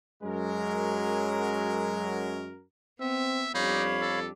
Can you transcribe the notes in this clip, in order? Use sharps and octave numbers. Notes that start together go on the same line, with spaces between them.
F#2 F#3 G#3 A#4
B3 C4 E5
F2 G3 D4 D#4 G4 C#5 F5 B5
A4